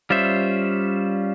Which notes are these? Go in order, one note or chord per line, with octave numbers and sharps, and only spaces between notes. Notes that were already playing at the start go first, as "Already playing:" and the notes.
G3 C#4 F4 C5 E5